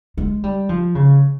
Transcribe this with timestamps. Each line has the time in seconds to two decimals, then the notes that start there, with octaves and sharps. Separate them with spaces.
0.18 G#3
0.44 G3
0.69 F3
0.95 C#3